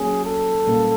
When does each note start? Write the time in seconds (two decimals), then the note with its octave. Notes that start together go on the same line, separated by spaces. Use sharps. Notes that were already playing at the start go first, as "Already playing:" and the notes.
Already playing: F#3 A#3 C#4 G#4
0.25 A4
0.67 A#2 G3 A#3 C#4